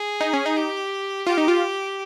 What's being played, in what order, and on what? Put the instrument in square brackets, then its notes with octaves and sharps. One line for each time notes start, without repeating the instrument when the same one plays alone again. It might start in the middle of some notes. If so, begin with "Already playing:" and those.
Already playing: [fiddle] G#4
[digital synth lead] D#4
C#4
D#4
[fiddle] G4
[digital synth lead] F4 [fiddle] G4
[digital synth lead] D#4
F4